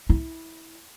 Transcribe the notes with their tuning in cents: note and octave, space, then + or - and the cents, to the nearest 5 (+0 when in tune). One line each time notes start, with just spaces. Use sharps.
E4 -20